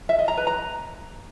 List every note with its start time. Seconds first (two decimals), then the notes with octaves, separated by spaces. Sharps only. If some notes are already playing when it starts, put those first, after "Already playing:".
0.09 E5
0.19 D#5
0.28 A#5
0.37 B4
0.47 A#5